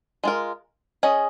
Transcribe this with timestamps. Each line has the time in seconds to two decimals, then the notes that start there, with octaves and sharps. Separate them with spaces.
0.24 G#3 F4 A#4
1.03 C#4 G#4 D#5